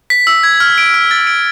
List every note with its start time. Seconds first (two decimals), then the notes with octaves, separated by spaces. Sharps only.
0.10 B6
0.27 E6
0.43 G#6
0.60 F6
0.78 D7
0.94 F6
1.11 A6
1.27 D7